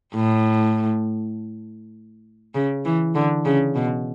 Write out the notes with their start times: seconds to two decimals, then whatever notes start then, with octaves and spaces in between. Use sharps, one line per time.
0.14 A2
2.55 C#3
2.85 E3
3.15 D3
3.45 C#3
3.75 B2